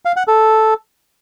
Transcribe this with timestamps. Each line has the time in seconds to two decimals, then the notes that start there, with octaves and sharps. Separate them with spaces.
0.05 F5
0.16 F#5
0.28 A4